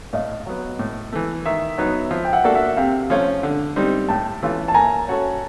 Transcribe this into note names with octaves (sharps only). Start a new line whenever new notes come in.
A2 D#5 F5
F#3 B3
A2
E3 A3
D#3 E5
F#3 B3 D#4
F3
G5
E5 F#5
A#3 D4 F#4 A4
E5 F#5
C3 F5 G5
F3 A3 C#4 F4
D3
G3 C4 D#4
A2 G5 A5
E3 A3 C#4 F4
A5
A#3 G#5 A#5
C#4 F#4 A4 C#5